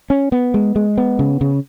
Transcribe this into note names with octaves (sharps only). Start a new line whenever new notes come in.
C#4
B3
G#3
G#3
B3
C#3
C#3